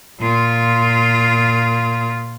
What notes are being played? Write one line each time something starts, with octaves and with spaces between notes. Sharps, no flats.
A#2 F4